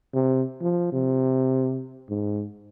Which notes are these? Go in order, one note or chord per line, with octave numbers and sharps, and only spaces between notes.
C3
F3
C3
G#2